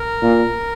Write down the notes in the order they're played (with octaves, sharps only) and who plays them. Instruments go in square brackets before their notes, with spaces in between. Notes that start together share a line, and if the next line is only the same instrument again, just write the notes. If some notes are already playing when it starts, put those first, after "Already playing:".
Already playing: [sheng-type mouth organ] A#4
[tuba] A#2